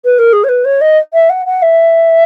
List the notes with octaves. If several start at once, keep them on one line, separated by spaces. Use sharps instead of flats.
B4
A#4
G#4
C#5
B4
C#5
D#5
E5
F#5
F#5
E5